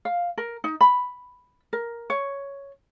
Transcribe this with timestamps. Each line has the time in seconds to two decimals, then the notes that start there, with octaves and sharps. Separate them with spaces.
0.05 F5
0.38 A#4
0.64 D#4
0.81 B5
1.73 A#4
2.10 C#5